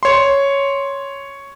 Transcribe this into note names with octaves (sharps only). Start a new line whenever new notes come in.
C#5 C6